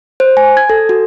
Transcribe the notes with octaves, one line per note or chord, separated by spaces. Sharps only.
C5
G#5
G#6
A4
F#4